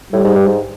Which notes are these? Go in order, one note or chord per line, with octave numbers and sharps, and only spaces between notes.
A2 G3
G#2
G2
G#2